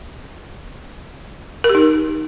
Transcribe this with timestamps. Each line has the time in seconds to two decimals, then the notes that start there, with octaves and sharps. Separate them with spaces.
1.64 A#4
1.69 G4
1.75 D#4